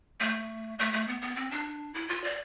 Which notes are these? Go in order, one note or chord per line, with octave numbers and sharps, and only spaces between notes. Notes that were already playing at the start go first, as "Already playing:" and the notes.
A3
A3
A3
B3
B3
C4
D4
E4
F4
D5